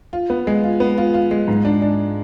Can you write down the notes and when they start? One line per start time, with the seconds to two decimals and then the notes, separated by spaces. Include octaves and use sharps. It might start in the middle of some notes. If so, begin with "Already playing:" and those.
0.13 F4
0.30 B3
0.47 G#3
0.64 F4
0.80 B3
0.98 F4
1.14 F4
1.31 G#3
1.48 G#2
1.65 D4
1.82 D4